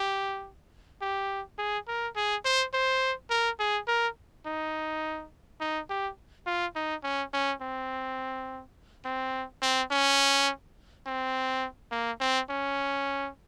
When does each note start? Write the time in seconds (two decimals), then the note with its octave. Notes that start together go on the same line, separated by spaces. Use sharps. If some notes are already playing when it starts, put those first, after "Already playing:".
Already playing: G4
1.02 G4
1.58 G#4
1.88 A#4
2.16 G#4
2.45 C5
2.74 C5
3.30 A#4
3.60 G#4
3.88 A#4
4.46 D#4
5.60 D#4
5.90 G4
6.46 F4
6.75 D#4
7.04 C#4
7.33 C#4
7.61 C4
9.05 C4
9.62 C4
9.91 C#4
11.06 C4
11.92 A#3
12.20 C4
12.50 C#4